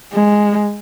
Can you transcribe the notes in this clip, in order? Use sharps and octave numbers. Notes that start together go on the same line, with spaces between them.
G#3